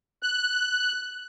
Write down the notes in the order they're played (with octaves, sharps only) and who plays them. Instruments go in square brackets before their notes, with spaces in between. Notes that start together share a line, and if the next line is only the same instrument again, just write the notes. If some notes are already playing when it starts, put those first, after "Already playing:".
[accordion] F#6